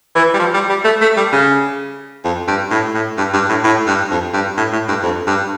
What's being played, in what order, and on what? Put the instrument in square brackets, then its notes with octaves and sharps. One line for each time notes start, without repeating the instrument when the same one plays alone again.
[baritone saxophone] E3
G3
F3
G3
G3
A3
A3
G3
C#3
F2
G2
A2
A2
G2
G2
A2
A2
G2
F2
G2
A2
A2
G2
F2
G2